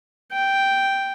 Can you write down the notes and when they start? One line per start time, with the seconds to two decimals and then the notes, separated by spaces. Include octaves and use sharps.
0.33 G5